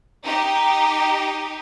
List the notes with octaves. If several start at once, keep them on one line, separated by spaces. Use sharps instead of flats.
D#4 G4